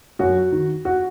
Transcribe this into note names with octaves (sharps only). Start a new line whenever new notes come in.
F#2 F#4
D#3
F#4